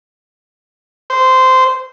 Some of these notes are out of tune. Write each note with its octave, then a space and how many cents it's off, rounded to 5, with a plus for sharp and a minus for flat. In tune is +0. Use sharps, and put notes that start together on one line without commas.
C5 -15